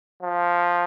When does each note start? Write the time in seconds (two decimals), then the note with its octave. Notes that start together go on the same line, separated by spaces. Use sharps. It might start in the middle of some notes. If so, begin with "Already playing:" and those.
0.23 F3